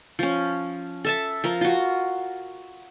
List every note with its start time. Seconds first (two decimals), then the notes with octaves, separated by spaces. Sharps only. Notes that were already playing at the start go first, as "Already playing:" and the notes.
0.19 F3 C#4
1.05 A4 E5 A5
1.44 F3 A#4
1.61 F4 F#4